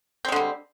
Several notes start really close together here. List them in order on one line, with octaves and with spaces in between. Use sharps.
C4 G#3 D3 G3